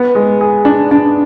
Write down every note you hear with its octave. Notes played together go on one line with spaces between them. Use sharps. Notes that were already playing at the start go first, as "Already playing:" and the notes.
Already playing: B3
G#3
G#4
D4
D4